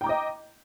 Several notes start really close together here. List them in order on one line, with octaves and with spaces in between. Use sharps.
G5 A#5 D6 D#5